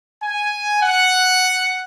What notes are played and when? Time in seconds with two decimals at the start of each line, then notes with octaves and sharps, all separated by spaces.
0.22 G#5
0.83 F#5